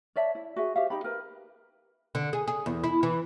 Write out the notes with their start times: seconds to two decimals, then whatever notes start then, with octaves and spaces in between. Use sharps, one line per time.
0.16 C#5 D5 E5 A5
0.35 E4
0.56 F#4 G#4 E5
0.76 G4 C5 E5 F5
0.90 D#4 G4 B5
1.04 A#4 B4
2.15 D3
2.33 G#4
2.48 G#4
2.66 E2
2.84 E4
3.03 E3